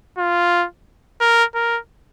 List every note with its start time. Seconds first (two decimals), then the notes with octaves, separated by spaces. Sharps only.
0.18 F4
1.20 A#4
1.55 A#4